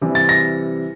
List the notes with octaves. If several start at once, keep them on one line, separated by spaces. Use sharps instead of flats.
C3 E3 G3
A6
A#6